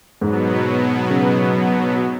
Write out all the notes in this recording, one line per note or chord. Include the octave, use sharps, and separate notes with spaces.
G#2 B2 F#3 B3
C#3